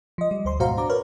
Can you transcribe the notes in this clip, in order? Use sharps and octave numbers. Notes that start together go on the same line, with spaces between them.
F3 D#5
G3
D2 C5 C6
G#2 B2 F#4 C5 F5 A#5
D4 A#5 D6
A#4 B4 C#5 F6